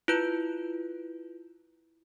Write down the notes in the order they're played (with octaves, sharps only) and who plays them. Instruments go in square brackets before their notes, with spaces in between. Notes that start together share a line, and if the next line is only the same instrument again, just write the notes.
[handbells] E4 F4 B4 G6